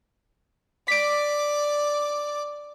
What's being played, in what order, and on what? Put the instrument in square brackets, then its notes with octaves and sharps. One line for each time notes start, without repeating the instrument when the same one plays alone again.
[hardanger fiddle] D5 D6 [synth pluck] B6 D7